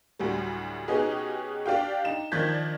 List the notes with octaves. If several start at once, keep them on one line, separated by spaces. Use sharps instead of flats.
D2 A2 F#3 G3
B2 B3 C#4 D#4 G4 G#4
D4 G4 F5 G5
D#4 E7
D#3 F3 D4 G6 G#6 B6